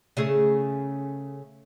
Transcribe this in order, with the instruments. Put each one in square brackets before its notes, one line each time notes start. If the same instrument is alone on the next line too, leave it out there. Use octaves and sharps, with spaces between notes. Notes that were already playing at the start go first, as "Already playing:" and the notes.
[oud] C#3 A3 G#4